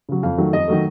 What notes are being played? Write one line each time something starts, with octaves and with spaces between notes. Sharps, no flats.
C#3 F#3
F2 F5
D#3 F#3 A3
F2 D#5
D#3 F#3 A3